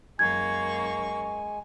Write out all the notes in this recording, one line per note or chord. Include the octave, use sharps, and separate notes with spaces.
F#2 G#3 A#3 G#5 C#6 G#6